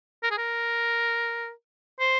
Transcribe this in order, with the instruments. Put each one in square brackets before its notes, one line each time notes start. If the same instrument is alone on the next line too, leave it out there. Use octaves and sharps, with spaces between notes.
[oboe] A#4
G#4
A#4
C5